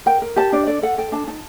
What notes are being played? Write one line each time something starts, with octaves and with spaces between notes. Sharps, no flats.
A#4 G5
A#4
G4 A5
D4 D5
A4 D5
A4 F#5
A4 G5
D4 A5
D#4 A5